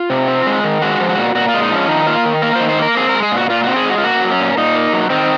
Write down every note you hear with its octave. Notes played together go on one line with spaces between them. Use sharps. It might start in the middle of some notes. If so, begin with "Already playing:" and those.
Already playing: F4
C3
C4
G#3
D#3
G#3 F#4
F3
F#4
A#2
A#2 F#4
F4
G#3
D#4
F3 C#4
D#3 D#4
A#3 F4
D#3
A#3 A#4
C5
D#3
C5
A#3 A#4
C4 G#4
A#4
G#3
G#4
A#2
F#4
A#2 F4
C4 F#4
G#4
G#3 F#4
F4
A#3 F#4
F#3
C#4
A#2
A#2 D#4
A#3
F#3
D#3 C4